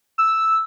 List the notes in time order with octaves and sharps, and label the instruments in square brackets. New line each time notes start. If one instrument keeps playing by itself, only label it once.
[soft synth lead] E6